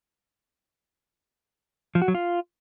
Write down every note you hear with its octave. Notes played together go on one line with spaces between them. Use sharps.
F3
F#4
F#3
F4